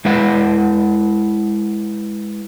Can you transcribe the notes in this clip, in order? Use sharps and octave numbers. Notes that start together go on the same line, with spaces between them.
G#3 E4 B4 E5 F#5